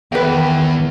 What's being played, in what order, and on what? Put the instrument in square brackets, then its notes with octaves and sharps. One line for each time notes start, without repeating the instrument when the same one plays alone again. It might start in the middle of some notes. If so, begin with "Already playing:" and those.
[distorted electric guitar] E2 [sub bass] D#3 [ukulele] B4 G5